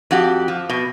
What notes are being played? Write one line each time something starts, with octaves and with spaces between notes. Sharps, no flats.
F2 F#4 G4
F3
B2